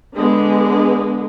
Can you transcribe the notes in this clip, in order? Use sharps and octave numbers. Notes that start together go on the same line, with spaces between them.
D3 G#3 B3